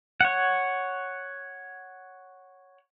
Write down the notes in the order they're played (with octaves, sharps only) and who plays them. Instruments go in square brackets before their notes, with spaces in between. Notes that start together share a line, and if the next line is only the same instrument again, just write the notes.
[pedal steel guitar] C#5 F#5